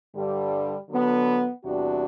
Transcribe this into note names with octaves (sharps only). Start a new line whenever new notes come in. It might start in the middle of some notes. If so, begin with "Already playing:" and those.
G2 D3 G3
D3 F#3 B3
E2 C3 G3 D4 F#4